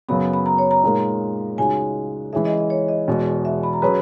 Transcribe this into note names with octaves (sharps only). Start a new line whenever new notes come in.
F#2 C#3 F#3 B3 B5
B5
A#5
C#5
A#5
A#2 G#3 D#4 A#4
C#2 C#3 G#3 D#4 F#4 G#5
E3 G#3 C#4 G#4 E5
D#5
D#5
C#5
D#5
E2 B2 G#3
E5
B5
A#5
F#3 C#4 G#4 B4 B5